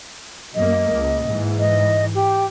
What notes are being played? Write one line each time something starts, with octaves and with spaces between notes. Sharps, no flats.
F#2 A#3 D#5
C#2
G#2 E3
D#5
G4